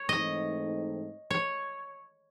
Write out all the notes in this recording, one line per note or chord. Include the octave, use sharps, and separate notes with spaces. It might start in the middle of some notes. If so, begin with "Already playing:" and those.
Already playing: C#5
G#2 E3 A3 C4 D#4 D#5
C#5